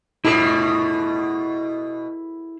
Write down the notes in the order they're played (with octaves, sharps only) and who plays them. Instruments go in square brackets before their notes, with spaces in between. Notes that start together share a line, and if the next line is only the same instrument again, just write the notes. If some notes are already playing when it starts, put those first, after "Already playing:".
[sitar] B2 [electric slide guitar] E4 G#4 A4